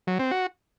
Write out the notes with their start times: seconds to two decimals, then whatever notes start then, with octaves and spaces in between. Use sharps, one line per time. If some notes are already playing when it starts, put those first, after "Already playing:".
0.07 F#3
0.19 C4
0.31 F#4